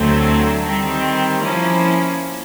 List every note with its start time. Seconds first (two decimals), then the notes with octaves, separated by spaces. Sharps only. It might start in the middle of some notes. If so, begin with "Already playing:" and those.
Already playing: D2 D3 F#3 A3 C4
0.65 D#3 G3 C4
1.41 F3 A#3 C#4 E4